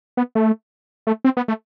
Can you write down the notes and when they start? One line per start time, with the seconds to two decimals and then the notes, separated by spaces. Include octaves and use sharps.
0.17 B3
0.35 A3
1.07 A3
1.24 C4
1.37 B3
1.48 A3